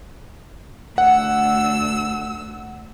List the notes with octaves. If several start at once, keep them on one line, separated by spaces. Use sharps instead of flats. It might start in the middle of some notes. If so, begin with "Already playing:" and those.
D2 F#5 E6